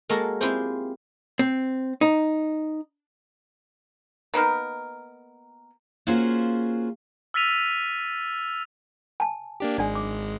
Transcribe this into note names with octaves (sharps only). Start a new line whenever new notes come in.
G#3 A#3 F#4 A4 A#4
C4 E4 F4 G4 G#4 C5
C4
D#4
A#3 B3 D#4 A#4
A#3 C#4 F4 F#4 G#4 C5
E6 F6 A6 B6 D#7 F7
G#5 A5
A#3 D4 G4
G#1 G#3 D4 D5 G#5
D6